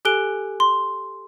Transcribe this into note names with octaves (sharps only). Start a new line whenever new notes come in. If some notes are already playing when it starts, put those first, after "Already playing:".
G4 A4 G#5 F#6 D7 G7
C6